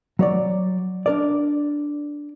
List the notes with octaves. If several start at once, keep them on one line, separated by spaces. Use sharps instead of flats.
F#3 C#5 D5
D4 A#4 D5